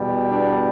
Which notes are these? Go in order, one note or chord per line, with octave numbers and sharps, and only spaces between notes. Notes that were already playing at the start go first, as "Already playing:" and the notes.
Already playing: E2 B2 G3
D4